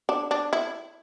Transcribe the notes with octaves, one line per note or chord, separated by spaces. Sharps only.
D4
D4
E4